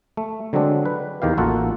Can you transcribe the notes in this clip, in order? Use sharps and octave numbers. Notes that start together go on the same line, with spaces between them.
A3
D3 F#3 G#3 C4 D4
B4
E2 D#3 G4 F5
A1 A#3 F4 F#4 A4 F#5